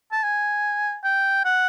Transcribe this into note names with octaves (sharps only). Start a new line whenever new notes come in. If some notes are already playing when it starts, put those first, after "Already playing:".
A5
G#5
G5
F#5